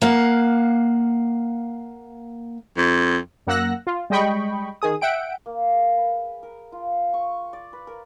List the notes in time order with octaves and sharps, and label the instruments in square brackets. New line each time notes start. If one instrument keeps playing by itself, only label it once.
[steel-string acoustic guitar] A#3 F5 F#5
[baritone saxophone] F2
[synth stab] F#2 A#3 F#5 E6 F#6 A#6
F4
G3 G#3 D#5 G5 B5 C#6
D#3 G#4 D#6
E5 F#5 G5 D7
[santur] A#3
G#4
B4
A#4
F4
C#6
D5
B4
A#4